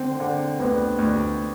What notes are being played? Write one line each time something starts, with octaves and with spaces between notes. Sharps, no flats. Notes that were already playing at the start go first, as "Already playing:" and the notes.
Already playing: D3 C4
D3
D2 B3
D2